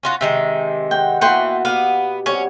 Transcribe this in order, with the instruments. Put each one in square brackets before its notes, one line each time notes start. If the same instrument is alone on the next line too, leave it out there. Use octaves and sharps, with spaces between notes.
[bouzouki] C#4 F4 F#4 [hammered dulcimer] G#5
[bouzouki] C3 D#3 G#3 [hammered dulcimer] G5
[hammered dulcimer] C#5 F#5 [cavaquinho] G5
[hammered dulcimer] B2 A#3 F#4 [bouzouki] E3 [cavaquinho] F#5 G5 C6
[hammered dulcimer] B2 G4 [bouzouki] B3 [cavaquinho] F5
[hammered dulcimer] C3 G3 F#4 [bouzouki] C#4 [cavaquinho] C#5